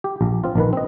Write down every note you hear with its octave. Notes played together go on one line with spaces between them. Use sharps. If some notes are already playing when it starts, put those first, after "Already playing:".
G4
A#1
C4 F4
A#1 D#3 B4
C4 D#5